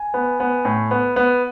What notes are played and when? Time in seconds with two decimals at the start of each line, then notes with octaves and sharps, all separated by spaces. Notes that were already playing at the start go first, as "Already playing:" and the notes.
Already playing: G#5
0.14 B3
0.40 B3
0.65 A2
0.91 B3
1.16 B3